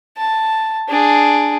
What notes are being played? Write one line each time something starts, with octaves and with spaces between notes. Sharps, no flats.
A5
D4 G#4